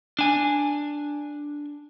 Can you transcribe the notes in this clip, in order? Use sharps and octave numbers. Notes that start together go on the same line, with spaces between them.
D4 G#5